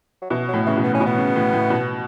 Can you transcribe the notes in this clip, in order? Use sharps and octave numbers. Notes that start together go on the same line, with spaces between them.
F#3
B2 E3
F#3
A2
C#3 E3
B2
B3
A2 C#4
B2
B3
C#3
A2
A2
B2